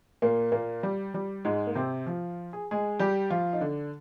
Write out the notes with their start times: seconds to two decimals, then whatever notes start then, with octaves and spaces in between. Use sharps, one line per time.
0.22 A#2 A#3
0.52 A#2 A#3
0.83 G3
1.14 G3
1.45 G#2 G#3
1.67 A#3
1.75 C3 C4
2.06 F3 F4
2.53 G#4
2.71 G#3 G#4
2.99 G3 G4
3.31 F3 F4
3.53 D#4
3.61 D3 D4